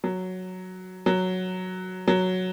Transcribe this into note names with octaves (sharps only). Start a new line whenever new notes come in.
F#3
F#3
F#3